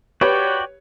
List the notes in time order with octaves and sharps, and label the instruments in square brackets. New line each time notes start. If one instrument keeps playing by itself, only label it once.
[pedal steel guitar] F#4 D5 G5 [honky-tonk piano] G4 B4 C#5